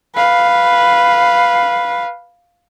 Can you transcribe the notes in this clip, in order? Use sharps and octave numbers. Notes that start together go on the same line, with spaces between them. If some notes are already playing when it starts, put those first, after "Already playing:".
B4 F5